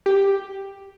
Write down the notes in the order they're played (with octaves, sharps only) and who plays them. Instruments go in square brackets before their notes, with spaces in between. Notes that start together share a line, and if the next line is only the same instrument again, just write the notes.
[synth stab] G4